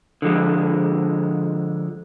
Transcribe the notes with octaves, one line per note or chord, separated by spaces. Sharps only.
D3 F3 G#3